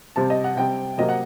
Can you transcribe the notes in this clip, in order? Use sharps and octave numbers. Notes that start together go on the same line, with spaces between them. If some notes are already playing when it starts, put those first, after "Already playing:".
C3 G3 C4 A5
D#5
F#5
C3 G3 C4 G5
C3 F#3 A#3 D#5
F#5